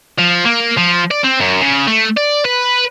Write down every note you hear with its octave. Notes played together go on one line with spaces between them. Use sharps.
F3
A#3
F3
D5
C4
F#2
C#3
A3
D5
B4